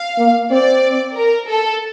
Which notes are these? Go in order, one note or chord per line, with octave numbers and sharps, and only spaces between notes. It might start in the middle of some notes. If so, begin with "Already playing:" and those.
Already playing: F5
A#3
C4 D5
A#4
A4